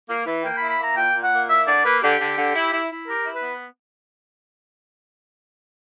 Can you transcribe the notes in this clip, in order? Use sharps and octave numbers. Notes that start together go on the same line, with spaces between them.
A#3
E3
A#3 G5
B5
E4
B5
A#3 A#5
A#2 G5
A#2
F#5
A#3
E4 E5
D3 D5
A#3 B4
D3 G4
D3
D3
E4
E4
E4
G4 A#4
E4
B4
B3